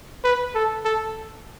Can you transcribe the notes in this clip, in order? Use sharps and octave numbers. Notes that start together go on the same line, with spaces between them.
B4
A4
A4